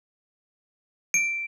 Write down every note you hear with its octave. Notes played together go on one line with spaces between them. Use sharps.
D7